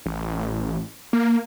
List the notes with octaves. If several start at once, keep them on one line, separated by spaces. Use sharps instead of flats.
A1
A#3